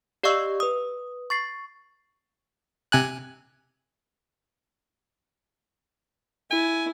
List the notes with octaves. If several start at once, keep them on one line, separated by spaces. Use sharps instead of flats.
G4 D5 D#5 F5 C#6 E6
B4 D#6
C#6 A6 C7
C3 G#5 F#6
E4 G#5